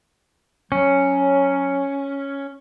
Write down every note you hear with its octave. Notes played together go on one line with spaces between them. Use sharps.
F#3 C#4